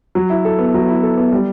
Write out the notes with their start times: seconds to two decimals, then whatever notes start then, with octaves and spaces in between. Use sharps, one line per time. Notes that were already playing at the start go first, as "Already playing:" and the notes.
0.15 F#3
0.30 E4
0.45 A4
0.59 B3
0.74 F#3
0.89 E4
1.03 A4
1.17 B3
1.33 G3